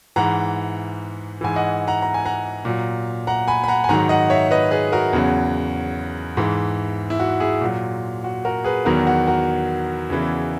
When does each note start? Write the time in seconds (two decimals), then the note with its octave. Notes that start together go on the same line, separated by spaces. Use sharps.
0.16 G#2 E3 F#5 A#5
1.41 G#2 E3 G#5
1.56 D#5 F#5
1.87 F#5 A#5
2.02 A#5
2.14 G#5
2.25 F#5 A#5
2.65 A#2 F#3
3.27 F#5 A#5
3.48 G#5 B5
3.64 B5
3.68 F#5 A#5
3.84 G#5
3.89 G#2 D#3 F#3 F#5 A#5
4.09 D#5 F#5
4.30 C#5 E5
4.51 B4 D#5
4.71 G#4 B4
4.92 F#4 A#4
5.13 E2 C#3 F#3
6.37 G#2 E3
7.10 E4
7.20 F#4
7.40 E4 G#4
7.61 A#2 F#3
8.24 F#4
8.45 F#4 A#4
8.64 G#4 B4
8.85 E2 D#3 F#3 F#4 A#4
9.07 F#4
9.27 F#4 A#4
10.10 E2 C#3 E3